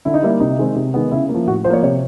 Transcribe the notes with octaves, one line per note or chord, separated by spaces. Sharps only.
D3 E4
D#4
G3 A#3 E4
C3 D#4
D#3 G#3 C4
C3
D#3 G#3 B3
C#3 E4
A#3
F3
A2 F#4
F3 C5
A#3 C#5
C3 C#5